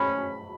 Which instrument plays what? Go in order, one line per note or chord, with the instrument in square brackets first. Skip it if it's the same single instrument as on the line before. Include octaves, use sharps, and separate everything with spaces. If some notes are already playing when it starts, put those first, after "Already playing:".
Already playing: [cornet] C#4 [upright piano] B5